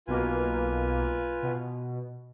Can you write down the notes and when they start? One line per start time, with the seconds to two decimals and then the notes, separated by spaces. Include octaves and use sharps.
0.07 B1 B2 A#3 F4 B4 G#5
1.43 B2